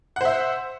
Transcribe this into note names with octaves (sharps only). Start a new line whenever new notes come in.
C5 E5 F#5